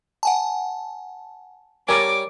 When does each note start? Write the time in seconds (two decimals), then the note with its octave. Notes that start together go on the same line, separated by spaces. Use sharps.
0.23 F#5 G#5 A5
1.89 G3 A#4 C#5 D5 G#5 D6